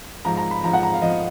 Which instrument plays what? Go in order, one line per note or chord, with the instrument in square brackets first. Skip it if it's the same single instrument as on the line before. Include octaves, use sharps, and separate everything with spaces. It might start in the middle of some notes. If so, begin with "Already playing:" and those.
[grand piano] G#2 F3 A#5
A#5
B5
F3 A#5
G#2
F#5
A#5
F5
F3 D#5